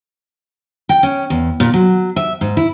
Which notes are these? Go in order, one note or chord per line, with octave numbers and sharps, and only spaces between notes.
G5
C#4
E2
A#2
F#3
E5
G#2
E4